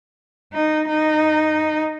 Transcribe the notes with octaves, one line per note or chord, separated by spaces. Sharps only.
D#4
D#4